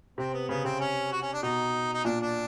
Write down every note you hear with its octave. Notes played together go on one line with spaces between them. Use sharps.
C3 C4
B3
C#3 B3
C3 C4
C#4
F#4
C#4
D4
B2 D#4
D#4
A#2 D4
D4